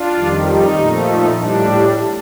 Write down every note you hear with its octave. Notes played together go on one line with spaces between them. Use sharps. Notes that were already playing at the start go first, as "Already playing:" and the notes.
Already playing: D4 F4
F2 D#3 G3
D#4
A#2 F3 A3
D#4
A2 G3 D4